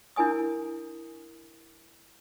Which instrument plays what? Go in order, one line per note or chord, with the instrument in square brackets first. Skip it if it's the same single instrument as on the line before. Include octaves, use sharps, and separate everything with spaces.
[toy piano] D4 E4 A#4 G#5 D#6